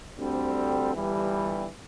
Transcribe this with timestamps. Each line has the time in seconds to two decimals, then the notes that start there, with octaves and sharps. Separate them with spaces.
0.17 D2 D3 G3 C4
0.93 G1 G2 E3 G3